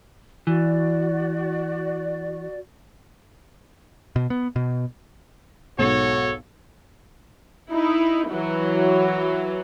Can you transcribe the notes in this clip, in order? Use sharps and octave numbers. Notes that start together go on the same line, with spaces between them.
E3 F#4 D5
B2
B3
B2
B1 G#2 F#4 A4 C#5
D#4 E4
E3 F#3